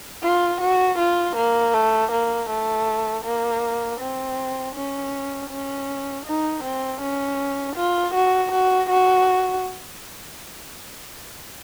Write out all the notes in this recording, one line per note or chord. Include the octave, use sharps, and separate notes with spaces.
F4
F#4
F4
A#3
A3
A#3
A3
A#3
C4
C#4
C#4
D#4
C4
C#4
F4
F#4
F#4
F#4